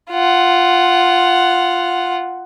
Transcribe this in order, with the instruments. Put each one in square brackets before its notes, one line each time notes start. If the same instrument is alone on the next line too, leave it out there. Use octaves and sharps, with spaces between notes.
[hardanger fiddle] F4 F#5